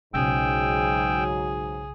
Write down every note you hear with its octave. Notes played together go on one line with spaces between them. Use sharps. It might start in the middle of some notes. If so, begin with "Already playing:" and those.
B1 G#2 C#3 F#3 G#4 G5 E6